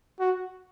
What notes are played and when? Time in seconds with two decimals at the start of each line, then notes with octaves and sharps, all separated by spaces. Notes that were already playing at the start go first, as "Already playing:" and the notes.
0.20 F#4